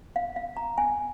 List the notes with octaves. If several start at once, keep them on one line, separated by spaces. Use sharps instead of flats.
F5
F5
A#5
G#5